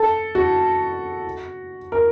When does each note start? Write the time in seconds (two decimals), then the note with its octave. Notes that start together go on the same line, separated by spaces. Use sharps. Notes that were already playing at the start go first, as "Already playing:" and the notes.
Already playing: A4
0.35 F#4
1.92 A#4